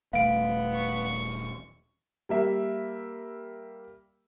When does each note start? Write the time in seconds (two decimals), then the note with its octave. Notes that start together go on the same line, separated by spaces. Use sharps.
0.13 D#1 A3 B3 F5 D7
0.75 C#6
2.29 G3 A#3 E5